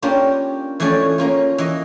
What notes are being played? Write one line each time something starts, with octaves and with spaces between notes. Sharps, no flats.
A#3 C#4 D4 F4 G4
E3 F3 A3 C#4 C#5 D5
A#3 C#4 F4
E3 D#5